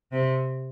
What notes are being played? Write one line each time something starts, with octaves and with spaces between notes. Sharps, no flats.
C3